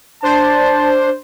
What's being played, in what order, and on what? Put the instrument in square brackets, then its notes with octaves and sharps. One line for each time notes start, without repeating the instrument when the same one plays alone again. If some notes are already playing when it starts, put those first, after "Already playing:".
[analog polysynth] D4 C5 [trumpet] A5